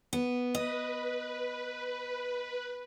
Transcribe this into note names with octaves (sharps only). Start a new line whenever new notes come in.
B3
B4 D#5